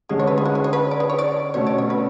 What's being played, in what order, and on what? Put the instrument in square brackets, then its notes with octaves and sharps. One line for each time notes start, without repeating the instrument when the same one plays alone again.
[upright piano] D3 G#3 C#4 [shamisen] G#4
[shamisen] C#5
B4
G#4
F#4
G#4
C#5
B4
D5
G#4
C#5
D5
[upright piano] B2 A3 C#4 [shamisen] C#5
[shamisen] D5
C#5
B4